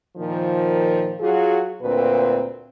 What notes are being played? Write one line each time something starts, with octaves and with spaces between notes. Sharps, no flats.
A#2 D#3 F3
F#3 F4 F#4 G#4
D2 A#2 C4 B4